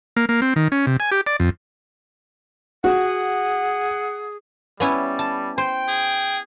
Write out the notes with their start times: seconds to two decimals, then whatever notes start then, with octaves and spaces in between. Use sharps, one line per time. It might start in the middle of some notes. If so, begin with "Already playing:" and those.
0.17 A#3
0.29 A#3
0.42 C4
0.56 D#3
0.72 C#4
0.87 C3
1.00 G#5
1.11 G4
1.27 D5
1.40 F2
2.84 F#4 G#4 F#5
4.80 G3 B3 C#4 E4
5.19 A5
5.58 C5 G5
5.89 G#4